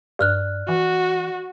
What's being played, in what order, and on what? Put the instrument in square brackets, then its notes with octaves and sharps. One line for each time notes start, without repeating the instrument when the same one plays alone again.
[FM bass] G2 [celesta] D5 F6 F#6
[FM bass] E3 [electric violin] F#4